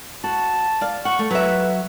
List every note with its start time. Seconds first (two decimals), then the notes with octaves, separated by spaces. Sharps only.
0.24 F#4 A5
0.81 D5 F5
1.05 F#5 C#6
1.19 A3
1.31 F#3 B4 E5